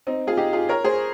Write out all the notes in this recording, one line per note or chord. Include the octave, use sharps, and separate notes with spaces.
C4 D#4
F4 G#4
D#4 G4
F4 G#4
A#4 C#5
G#4 C5